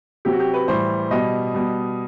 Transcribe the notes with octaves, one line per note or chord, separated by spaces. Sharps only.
C3 F#3 G4
F#4
G4
B4
A2 E3 G3 C5
B2 G3 D#5
B2 G3